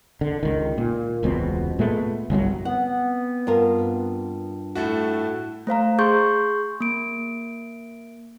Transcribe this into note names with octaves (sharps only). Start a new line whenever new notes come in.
D3
C#2 D#3
A#2
E1 C#2 B2 C4
A#2 G#3 A3 B3
G1 C2 C#3 F#3
B3 C4 F#5
G2 F4 A#4
A2 A3 F#4
A3 C5 F5 A#5
G#4 C6 C#6 G6
A#3 D7